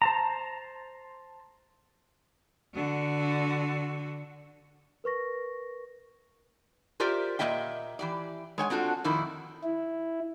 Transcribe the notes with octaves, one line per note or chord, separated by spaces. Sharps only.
C5 A5 A#5
D3 F#4
A#4 B4 C#6 A#6
F4 G4 A#4 C5 D5 E5
A#2 E3 A#3 D#5 E5 G5
E3 G4 D5
G#3 C#5 G5 G#5
C4 D4 F4 F#4 A4
F2 A#2 D#3 E4
E4